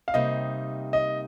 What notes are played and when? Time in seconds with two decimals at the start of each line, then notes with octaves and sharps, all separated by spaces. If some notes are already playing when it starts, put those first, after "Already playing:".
0.08 F5
0.14 C3 G3 A#3 D#4 D#5
0.93 D#5